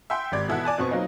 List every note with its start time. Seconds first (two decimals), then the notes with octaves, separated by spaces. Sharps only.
0.10 E5 F#5 G5 C6
0.32 G#1 G4 D5 G#6
0.48 B2 E3 E4 A4 F#5 F#6
0.65 D5 G#5 A5
0.78 F2 B2 B3 C4 C#6
0.91 F#3 A#3 C4 D#4